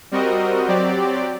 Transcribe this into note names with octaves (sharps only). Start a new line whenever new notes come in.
G3 C4 F#4 A#4 D#5
F#3 C4 G4 D5